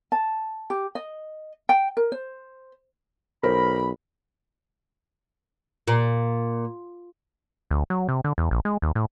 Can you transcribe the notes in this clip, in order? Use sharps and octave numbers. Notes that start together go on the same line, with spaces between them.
A5
G4
D#5
G5
A#4
C5
B1 A#4 C5 B5
A#2
D2
F#3
C3
D3
E2
A#1
G#3
D#2
A2